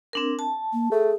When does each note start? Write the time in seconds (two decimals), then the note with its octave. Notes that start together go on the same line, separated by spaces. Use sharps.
0.13 C4 D4 A#4
0.39 A5
0.73 A#3
0.91 A3 G#4